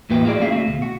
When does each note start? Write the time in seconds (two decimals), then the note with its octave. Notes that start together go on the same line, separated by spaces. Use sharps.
0.09 E2 A2 A#3 F#4 B4 G5
0.25 F4 F#4 G#4 D5
0.40 A3 C#4 G#4 E5 F5
0.52 A3 F#4
0.67 D2 B2
0.82 F#4